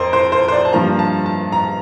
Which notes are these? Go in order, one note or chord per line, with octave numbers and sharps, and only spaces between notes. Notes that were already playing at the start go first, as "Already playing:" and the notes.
Already playing: F2 A#4 C5
C5
C5
C5
D5
A5
G2 F3 A#3 A#5
A5
A5
A#5